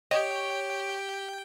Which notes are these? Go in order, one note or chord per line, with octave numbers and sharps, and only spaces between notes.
G4 C#5 D#5 G5